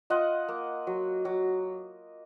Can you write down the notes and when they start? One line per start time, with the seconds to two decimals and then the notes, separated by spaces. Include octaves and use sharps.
0.10 F4 D#5 F#5
0.48 A#3
0.87 F#3
1.25 F#3